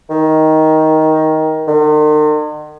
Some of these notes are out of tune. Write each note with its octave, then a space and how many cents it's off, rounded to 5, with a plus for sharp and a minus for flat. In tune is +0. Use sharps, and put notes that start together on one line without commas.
D#3 +15
D#3 -45